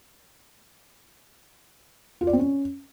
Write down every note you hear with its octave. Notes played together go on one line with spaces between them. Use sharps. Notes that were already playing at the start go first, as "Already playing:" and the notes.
F4
D5
C4
C#4